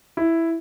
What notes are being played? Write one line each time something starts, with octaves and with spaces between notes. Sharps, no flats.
E4